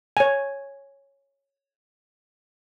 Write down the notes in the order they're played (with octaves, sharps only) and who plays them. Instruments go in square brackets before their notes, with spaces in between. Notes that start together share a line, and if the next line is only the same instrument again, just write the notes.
[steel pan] C#5 G#5